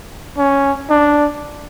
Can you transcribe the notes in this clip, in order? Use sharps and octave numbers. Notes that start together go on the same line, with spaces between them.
C#4
D4